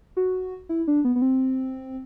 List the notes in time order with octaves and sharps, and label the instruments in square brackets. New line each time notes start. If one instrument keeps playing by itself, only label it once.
[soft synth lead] F#4
E4
D4
B3
B3
C4